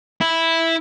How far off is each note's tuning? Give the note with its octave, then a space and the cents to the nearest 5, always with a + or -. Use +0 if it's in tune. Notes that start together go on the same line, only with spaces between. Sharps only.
E4 -5